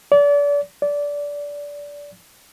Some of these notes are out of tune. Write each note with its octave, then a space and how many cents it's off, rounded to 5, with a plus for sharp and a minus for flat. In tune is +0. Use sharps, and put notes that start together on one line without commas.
D5 -35
D5 -20